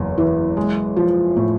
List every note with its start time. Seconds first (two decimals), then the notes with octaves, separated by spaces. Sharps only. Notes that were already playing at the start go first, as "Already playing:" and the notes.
Already playing: F#1 E2
0.18 E3
0.57 G#3
0.97 F3
1.37 A2